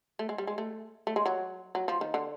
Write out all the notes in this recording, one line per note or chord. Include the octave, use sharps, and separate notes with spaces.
A3
G#3
G3
G#3
A3
A3
G#3
F#3
F#3
F3
D#3
D3